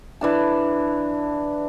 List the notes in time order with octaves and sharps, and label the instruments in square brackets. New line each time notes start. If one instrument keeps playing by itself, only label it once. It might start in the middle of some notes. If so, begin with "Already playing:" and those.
[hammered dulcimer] E3 D4 A5